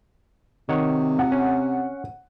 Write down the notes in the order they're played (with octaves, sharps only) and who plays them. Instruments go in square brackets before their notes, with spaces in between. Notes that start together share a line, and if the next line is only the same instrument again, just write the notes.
[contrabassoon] C3 [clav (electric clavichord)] D#3 C#5 F#5
[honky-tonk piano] F#5
[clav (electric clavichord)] C#4